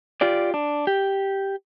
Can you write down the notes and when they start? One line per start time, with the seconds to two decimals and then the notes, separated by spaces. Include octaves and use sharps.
0.21 F4 G4 D5
0.54 D4
0.87 G4